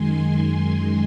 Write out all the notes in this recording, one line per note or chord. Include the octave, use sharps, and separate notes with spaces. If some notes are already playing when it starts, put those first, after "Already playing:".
Already playing: F#2 D#3 G#3 G#5 C6